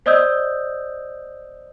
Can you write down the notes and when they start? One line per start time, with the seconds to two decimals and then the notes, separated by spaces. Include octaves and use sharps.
0.06 C5 D5 D#5 D#6 E6 G6